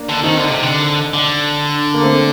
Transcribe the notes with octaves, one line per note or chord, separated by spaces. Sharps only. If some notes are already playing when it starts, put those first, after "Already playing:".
Already playing: A#3 D4
D3
D#3 C4 D#4
D3
C3
D3
D3
A#3
A3 C4